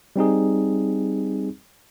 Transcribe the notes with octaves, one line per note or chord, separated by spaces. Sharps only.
G3 C4 D#4 G#4